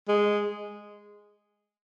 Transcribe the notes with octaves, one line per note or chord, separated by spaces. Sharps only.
G#3